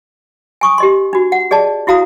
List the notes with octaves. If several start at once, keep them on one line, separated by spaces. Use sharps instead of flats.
G#5 C#6 D#6
G4 D#5 C6
D4 F#4
F#5
G#4 D5 D#5 A5
E4 F#4 F5 A#5 D#6